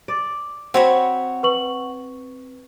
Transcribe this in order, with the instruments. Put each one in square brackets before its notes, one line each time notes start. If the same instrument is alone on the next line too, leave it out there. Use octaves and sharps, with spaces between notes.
[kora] D5
[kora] C4 [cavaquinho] F#4 C#5 B5
[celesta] B4 C#6 F#7